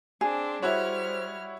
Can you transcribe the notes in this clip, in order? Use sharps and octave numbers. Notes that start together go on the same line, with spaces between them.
C4 D4 G#4
G3 E4 F#4 C5 C#5 F6